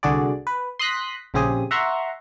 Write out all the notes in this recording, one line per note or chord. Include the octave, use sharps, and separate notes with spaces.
C2 D3 F#4 G#4 D5
B4
C6 D#6 F#6 A#6 B6
A#1 C#3 C4 G4 G#4 D#6
E5 F#5 A#5 C6 C#6